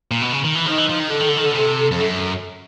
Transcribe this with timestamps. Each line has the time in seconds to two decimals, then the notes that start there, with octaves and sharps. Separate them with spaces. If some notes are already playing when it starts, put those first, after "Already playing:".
0.11 A#2
0.21 B2
0.33 C#3
0.44 D#3
0.55 E3
0.66 F3 D#4
0.72 D#3
0.78 E3
0.89 F3
1.00 D#3
1.11 D3 A4
1.20 D#3
1.29 D3
1.37 D#3
1.46 D3
1.52 B2
1.55 C3 A4
1.91 F2
2.00 F#2